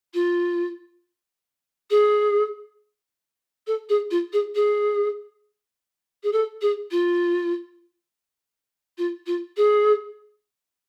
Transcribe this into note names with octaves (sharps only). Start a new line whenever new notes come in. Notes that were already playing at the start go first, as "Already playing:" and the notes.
F4
G#4
A4
G#4
F4
G#4
G#4
G#4
A4
G#4
F4
F4
F4
G#4